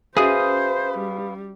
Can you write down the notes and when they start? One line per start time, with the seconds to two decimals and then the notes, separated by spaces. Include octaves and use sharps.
0.17 C#4 F#4 G#4 B4 C5 E5 F5 D#6
0.98 G3